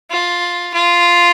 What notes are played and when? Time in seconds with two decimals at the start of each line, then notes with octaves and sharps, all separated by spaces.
0.10 F4
0.74 F4